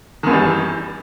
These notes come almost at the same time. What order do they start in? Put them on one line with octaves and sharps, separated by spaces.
D#3 F#2 E3 G3